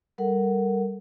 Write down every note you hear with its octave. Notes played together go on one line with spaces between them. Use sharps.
G3 A4 A#4 F#5